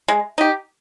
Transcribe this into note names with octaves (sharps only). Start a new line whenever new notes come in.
G#3
D#4 G4